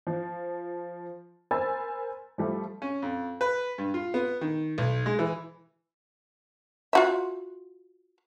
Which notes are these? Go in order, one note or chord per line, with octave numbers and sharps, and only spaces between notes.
F3
A#4 C5 G#5 B5 E6 A6
F3 G3 A3
C#4
F2
B4
G2
F4
B3
D#3
B1
G#3
E3
F4 F#4 E5